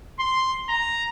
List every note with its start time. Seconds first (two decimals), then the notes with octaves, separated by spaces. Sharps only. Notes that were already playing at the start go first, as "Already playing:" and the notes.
0.19 C6
0.69 A#5